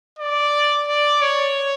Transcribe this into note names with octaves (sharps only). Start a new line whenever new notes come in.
D5
D5
C#5